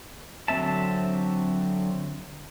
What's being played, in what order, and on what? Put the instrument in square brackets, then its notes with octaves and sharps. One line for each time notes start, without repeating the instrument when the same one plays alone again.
[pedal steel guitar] D3 F#3 C4 E5 A5